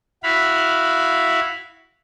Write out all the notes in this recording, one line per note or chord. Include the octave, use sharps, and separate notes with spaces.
E4 F#4 F5 B5